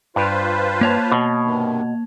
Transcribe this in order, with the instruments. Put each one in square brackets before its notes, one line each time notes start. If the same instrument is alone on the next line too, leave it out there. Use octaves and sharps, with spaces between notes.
[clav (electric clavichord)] G2 [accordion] F4 B4 C5
[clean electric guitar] A#3 C#5 A5
[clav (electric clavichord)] B2
[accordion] G2 C3 D#3